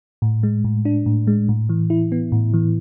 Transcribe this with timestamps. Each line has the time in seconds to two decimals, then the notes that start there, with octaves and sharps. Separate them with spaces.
0.22 A2
0.43 G#3
0.64 A2
0.85 D4
1.06 A2
1.27 G#3
1.49 A2
1.69 E3
1.90 E4
2.12 B3
2.32 A2
2.54 E3